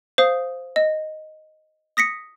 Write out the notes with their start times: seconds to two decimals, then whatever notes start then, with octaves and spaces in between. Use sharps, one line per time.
0.18 C5 F5 D#6
0.76 D#5
1.97 D#6 A#6 B6 C#7